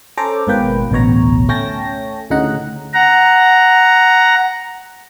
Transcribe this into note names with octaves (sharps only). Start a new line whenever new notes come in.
C#4 A4 C5 A#5 D6
G#1 G#2 B2 A#3 B4 G5
A1 D2 B2 C#5 A#5
A3 C#4 C#5 G5 A5 A#6
D2 A2 C#3 D#4 F#5 A#5
F#5 A#5